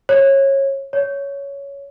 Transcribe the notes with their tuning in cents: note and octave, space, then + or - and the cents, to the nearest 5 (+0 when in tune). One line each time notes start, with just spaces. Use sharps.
C#5 -25
C#5 +10